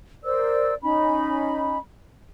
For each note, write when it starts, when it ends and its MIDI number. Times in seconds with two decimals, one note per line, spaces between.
0.24 0.74 70
0.24 0.74 72
0.24 0.74 74
0.24 0.74 88
0.82 1.78 61
0.82 1.78 63
0.82 1.78 83